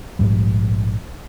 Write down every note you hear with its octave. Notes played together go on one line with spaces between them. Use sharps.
A#1 G#2 G3